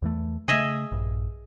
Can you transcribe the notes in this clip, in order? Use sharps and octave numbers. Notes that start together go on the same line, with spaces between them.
E2 E3 A3
C#3 A3 G#4 D#5 E5
A#1 G2